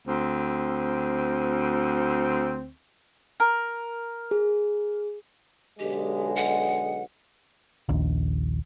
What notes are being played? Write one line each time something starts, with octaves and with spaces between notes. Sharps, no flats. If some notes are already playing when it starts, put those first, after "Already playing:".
D2 C4
A#4
G#4
B1 D3 G#3 G4
F#5
A#1 D#2